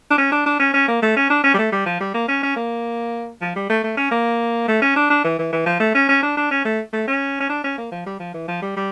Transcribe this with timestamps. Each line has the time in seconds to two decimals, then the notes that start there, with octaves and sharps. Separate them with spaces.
0.11 D4
0.18 C#4
0.32 D4
0.46 D4
0.60 C#4
0.74 C#4
0.88 A#3
1.02 A3
1.16 C#4
1.30 D4
1.44 C#4
1.54 G3
1.59 A3
1.72 G3
1.86 F3
2.01 G3
2.14 A#3
2.28 C#4
2.43 C#4
2.56 A#3
3.41 F3
3.56 G3
3.70 A3
3.84 A3
3.97 C#4
4.11 A#3
4.68 A3
4.82 C#4
4.96 D4
5.10 D4
5.24 E3
5.39 E3
5.52 E3
5.66 F3
5.80 A3
5.95 C#4
6.09 C#4
6.23 D4
6.37 D4
6.51 C#4
6.65 A3
6.93 A3
7.08 C#4
7.40 C#4
7.49 D4
7.64 C#4
7.78 A#3
7.92 F3
8.06 G3
8.20 F3
8.34 E3
8.48 F3
8.62 G3
8.77 G3